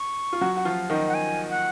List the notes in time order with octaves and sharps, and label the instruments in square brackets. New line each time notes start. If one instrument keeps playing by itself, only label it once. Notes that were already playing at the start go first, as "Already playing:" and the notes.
Already playing: [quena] C#6
[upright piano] F4
F#3 F#4
F#4
F3 F4
D#3 D#4
[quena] F#5
G#5
F#5